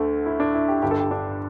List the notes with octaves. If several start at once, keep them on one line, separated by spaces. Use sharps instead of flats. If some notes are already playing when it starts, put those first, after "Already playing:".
Already playing: D2 D3 A3
E4
D4
E4
G4
G1 G2 D3 G4
A4
G4
D4